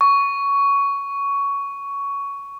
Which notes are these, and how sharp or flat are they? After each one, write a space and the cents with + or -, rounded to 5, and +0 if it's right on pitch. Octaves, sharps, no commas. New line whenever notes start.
C#6 +15